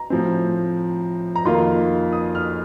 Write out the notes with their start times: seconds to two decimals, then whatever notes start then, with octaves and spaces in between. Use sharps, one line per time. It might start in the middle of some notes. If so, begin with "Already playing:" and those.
Already playing: A#5
0.10 A2 F3 C4
1.36 A#5
1.45 F2 D#3 A#3 F4 C6
2.12 D#6
2.35 F6